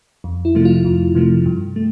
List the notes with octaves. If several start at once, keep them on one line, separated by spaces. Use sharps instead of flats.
F2
E4
C3 F3 A3
F4
F2
C3 F3 A3
G2
A3